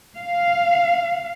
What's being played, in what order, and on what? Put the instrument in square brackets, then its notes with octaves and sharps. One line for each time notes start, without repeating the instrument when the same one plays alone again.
[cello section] F5